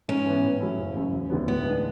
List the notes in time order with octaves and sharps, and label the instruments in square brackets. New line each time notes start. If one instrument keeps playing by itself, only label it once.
[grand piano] G#2 [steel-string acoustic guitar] C#4
[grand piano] E3 B3
A2
F#3 A3 C#4 E4
F#1
F#2 C#3
E1
D2 D3 F#3 B3
[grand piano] A2 [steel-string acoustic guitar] B3
[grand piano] G#3 D4